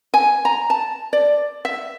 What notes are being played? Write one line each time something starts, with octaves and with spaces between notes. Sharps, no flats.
G#5
A#5
A5
D5
E5